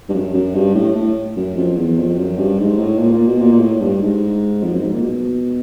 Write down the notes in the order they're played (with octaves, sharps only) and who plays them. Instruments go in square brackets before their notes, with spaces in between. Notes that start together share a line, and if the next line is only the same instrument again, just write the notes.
[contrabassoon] G2
F#2
F#2
G2
A2
A2
F#2
F2
E2
F2
F2
F#2
G2
G#2
A2
A#2
A#2
B2
A#2
A#2
A2
G2
G#2
F2
F#2
G#2
A#2
B2